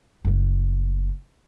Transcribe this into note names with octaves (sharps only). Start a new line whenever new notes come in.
F#1 A3